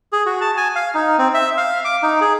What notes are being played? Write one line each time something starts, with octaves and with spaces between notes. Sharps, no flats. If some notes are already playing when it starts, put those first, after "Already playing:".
G#4
F#4
A5
G#5
F5
D#4
C4
E5
F5
D6
D#4
G#4